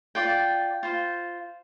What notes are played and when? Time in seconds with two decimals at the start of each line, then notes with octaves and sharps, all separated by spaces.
0.15 F4 D5 G5
0.83 F4 C5